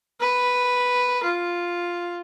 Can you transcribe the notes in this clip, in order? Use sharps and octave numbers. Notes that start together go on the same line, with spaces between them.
B4
F4